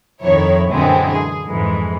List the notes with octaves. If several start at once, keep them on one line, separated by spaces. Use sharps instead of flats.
F2 D#3 E4 C#5
F#2 A#2 D3 E3 G#3 C4
G#4
F2 G#2 E3 G#3